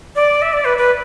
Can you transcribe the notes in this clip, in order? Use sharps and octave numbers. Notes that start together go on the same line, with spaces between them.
D5
E5
D5
B4
B4